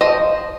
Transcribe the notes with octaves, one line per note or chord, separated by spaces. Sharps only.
F3 C5 D#5